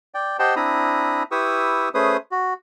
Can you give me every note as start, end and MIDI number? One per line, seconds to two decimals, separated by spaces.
0.14 0.37 74
0.14 0.37 79
0.39 0.55 67
0.39 0.55 72
0.39 0.55 75
0.39 0.55 78
0.39 0.55 79
0.39 0.55 81
0.56 1.23 60
0.56 1.23 62
0.56 1.23 64
0.56 1.23 82
0.56 1.23 83
0.56 1.23 87
1.31 1.89 64
1.31 1.89 67
1.31 1.89 71
1.31 1.89 85
1.31 1.89 87
1.31 1.89 88
1.94 2.17 57
1.94 2.17 61
1.94 2.17 68
1.94 2.17 71
1.94 2.17 72
1.94 2.17 87
2.31 2.54 66